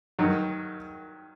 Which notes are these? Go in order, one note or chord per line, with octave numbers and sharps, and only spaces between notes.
G2 D#3 F#3